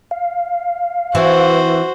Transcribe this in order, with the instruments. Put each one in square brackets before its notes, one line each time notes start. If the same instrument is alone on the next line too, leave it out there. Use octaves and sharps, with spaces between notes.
[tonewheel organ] F5
[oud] E3 C4 [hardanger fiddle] F#4 C5